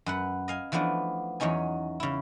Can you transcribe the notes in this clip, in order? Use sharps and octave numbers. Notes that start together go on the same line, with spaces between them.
F#2 B4 F#5
D#5 F5 G#5
E3 F3 A3 B3 D4
E2 F#3 C#4 D#4 G#5
C#3 E4